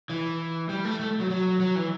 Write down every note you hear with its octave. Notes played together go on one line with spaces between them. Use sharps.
E3
G3
A3
A3
F#3
F#3
F#3
E3